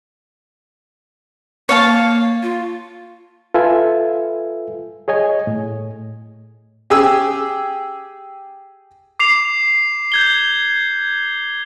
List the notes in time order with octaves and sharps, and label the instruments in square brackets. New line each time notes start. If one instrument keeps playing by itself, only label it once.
[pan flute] A#3 [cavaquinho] C#5 F5 A5
[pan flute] F4
[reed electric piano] F4 A4 B4 E5 G#5
G#4 C#5 D#5 G#5
A2
[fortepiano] G4 G#4 G#5 E6
[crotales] D6 C7 F7
G6 G#6 G7